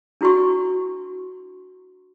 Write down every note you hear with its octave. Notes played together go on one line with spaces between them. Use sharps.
D4 E4 F#4 C6 C#6